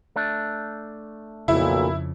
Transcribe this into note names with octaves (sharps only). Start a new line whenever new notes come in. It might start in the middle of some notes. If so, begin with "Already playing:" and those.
A3 D4
B1 F2 A#2 C#3 E4